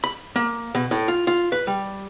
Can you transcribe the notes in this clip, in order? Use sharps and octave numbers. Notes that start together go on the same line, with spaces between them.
B5
A#3
B2
A2
F4
F4
B4
G3